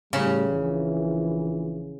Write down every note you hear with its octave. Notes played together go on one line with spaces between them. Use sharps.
A1 A2 C#3 G3
A#1 E3